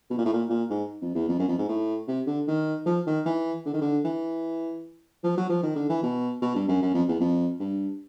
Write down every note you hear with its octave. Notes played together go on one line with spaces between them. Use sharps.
B2
A#2
A2
A#2
A#2
G#2
F2
E2
F2
F#2
F2
G#2
A2
C3
D3
D#3
F3
D#3
E3
D3
D#3
D3
E3
F3
F#3
F3
D#3
D3
E3
B2
B2
G2
F#2
F#2
F2
E2
F2
G2